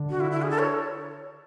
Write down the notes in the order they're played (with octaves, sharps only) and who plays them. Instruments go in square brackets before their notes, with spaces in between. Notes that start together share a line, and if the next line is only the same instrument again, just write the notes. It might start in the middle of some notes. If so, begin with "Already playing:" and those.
Already playing: [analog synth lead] D3
[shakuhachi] F#4
E4
E4
G#4
A4
C#5